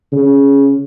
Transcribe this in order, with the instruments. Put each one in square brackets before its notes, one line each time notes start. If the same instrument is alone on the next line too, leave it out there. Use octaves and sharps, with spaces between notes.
[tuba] C#3